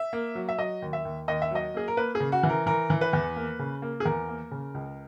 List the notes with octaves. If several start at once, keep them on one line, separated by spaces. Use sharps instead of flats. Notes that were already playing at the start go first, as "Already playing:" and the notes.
Already playing: E5
A#3
F#3
E5
F#3 D#5
D#2
E5
D#2
D#2 D#5
E5
F#3 D#5
A#3 G#4
A#4
A#3 B4
G#4
C#3
F#4
E3
A#4
E3 A#4
E3
B4
E2
A#3
C#3
A#3
G#4
E2 A#4
A#3
C#3
C#2